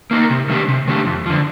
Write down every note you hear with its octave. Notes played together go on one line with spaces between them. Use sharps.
A#3 D#4 A#4
C3
D#3 A3 D4 G4
C3
D#3 A3 D4 G4
F2
D3 F3